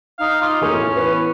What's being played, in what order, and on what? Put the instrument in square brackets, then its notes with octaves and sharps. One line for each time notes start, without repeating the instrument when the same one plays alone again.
[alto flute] D#4 [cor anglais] F5
[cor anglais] F4 [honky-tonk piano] D6
[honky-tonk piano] F1 A#3 G#4 [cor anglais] C#4
[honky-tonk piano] A2
[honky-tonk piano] E3 B3 [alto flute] B4